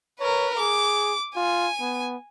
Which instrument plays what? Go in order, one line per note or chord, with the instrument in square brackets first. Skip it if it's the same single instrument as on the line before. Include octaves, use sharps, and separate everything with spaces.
[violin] A#4 B4 [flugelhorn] C#5
[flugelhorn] G#4 [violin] D6
[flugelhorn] F4 [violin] G#5
[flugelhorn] B3